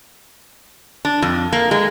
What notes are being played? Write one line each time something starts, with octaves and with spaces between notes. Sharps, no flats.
D4
F2
A#3
G#3